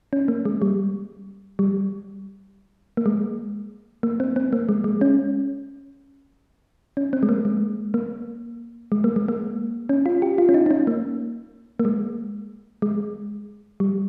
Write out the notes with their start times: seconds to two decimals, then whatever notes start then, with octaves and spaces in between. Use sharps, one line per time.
0.13 C#4
0.28 A#3
0.45 G#3
0.62 G3
1.59 G3
2.97 A#3
3.06 G#3
4.03 A#3
4.20 C4
4.36 C4
4.53 A#3
4.69 G#3
4.84 G#3
5.01 C#4
6.97 C#4
7.13 C4
7.23 G#3
7.29 A#3
7.45 G#3
7.94 A#3
8.92 G#3
9.04 A#3
9.16 G#3
9.28 A#3
9.89 C#4
10.06 F4
10.22 G4
10.38 F4
10.49 C#4
10.54 D#4
10.66 D#4
10.71 C#4
10.87 A#3
11.80 A#3
11.85 G#3
12.82 G#3
13.80 G3